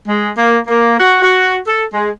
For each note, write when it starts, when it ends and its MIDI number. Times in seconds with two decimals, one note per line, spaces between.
0.07 0.31 56
0.38 0.59 58
0.67 0.96 58
1.00 1.18 66
1.22 1.57 66
1.67 1.84 69
1.93 2.11 56